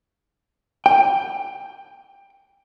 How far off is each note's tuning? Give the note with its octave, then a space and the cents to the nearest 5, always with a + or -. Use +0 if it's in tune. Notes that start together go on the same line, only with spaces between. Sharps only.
G5 +15